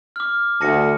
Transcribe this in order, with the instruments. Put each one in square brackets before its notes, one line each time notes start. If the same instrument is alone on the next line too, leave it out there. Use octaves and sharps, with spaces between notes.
[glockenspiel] D6 F6
[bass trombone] D2 [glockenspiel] A5 A#6 C#7